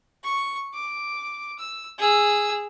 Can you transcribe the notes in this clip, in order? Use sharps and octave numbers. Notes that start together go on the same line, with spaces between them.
C#6
D6
E6
G#4 E6